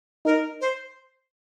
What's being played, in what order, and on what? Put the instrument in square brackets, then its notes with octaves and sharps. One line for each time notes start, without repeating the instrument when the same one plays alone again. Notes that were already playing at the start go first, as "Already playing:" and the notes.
[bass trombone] D#4 [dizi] A#4
[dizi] C5